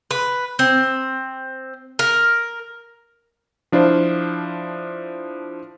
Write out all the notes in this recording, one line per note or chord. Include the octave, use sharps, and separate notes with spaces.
B4
C4
A#4
F3 D4 E4 F4 C5